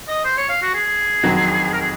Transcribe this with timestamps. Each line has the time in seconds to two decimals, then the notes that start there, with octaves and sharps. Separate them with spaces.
0.08 D#5
0.25 C5
0.37 C#5
0.49 F5
0.62 F#4
0.74 G#4
1.23 F2 D#3 F#3 C4 F#4
1.73 A#4
1.81 G#4